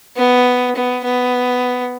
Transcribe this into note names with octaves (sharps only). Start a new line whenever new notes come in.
B3
B3
B3